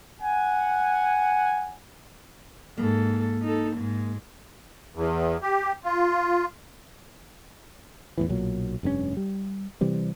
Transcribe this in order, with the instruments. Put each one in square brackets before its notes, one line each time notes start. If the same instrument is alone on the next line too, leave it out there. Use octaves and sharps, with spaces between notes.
[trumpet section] F#5 G#5
[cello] G#2 A4 [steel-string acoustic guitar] A#3
[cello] D#4 A4
G#2 G#3
[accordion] E2
G4
F4
[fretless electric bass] E2 A2 E3
B1 A#2 F#3
F1 G2 C3 C#4
G3
C3 E3 G3 C4